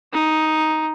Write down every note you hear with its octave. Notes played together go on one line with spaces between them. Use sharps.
D#4